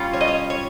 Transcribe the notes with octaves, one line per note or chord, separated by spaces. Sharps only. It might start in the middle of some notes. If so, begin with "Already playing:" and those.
Already playing: G3 C#4 F4
C#5
D#5
C#5
C#5